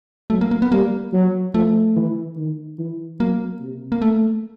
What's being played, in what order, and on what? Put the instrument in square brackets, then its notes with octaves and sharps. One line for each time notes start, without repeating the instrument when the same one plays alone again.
[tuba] F#3 [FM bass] A3
[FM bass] A#3
A#3
B3
[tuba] G3 [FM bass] A#3
[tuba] F#3
[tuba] F3 [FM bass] A3
[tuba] E3
D#3
E3
[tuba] F#3 [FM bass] A#3
[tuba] C3
[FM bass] A#3
A3